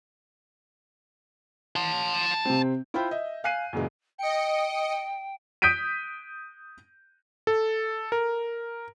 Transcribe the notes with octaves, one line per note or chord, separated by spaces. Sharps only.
A5 C6
C3 C4
E4 F4 C5 G5 B5 G6
D#5 E5
F5 G#5 F#6 C7 D#7
F#2 A#2 C#3 E3 G#3
D#5 G5 C#7
D#6 G6 B6 D7 D#7
A4
A#4